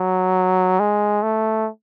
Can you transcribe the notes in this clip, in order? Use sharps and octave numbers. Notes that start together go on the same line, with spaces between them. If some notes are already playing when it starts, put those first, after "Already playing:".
Already playing: F#3
G#3
A3